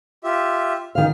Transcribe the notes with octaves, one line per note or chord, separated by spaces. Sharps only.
F4 G4 E5
D#3 F5 F6